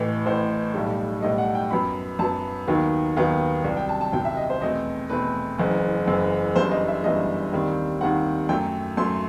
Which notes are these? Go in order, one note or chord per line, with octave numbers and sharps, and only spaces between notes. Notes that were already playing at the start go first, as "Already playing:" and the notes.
Already playing: A1 A2 E3
A1 A2 E3 C5
B1 A2 G3
B1 A2 G3 D#5
F#5
G5
F#2 F#3 B3 B5
F#2 F#3 B3 A5
D#2 D#3 F#3 B3
D#2 D#3 F#3 B3
C2 C3 F#3
G5
A5
A5
C2 C3 F#3 G5
E5
D#5
C5
E2 B2 A3 C4 D#5
E2 B2 A3 C4 B4
F#1 F#2 E3
F#1 F#2 E3
G1 F#2 E3 G3 C5
D#5
E5
G1 F#2 E3 G3 D#5
D#2 D#3 G3 C4
D#2 D#3 G3 C4 F#5
F#2 F#3 A3 G5
F#2 F#3 A3 C6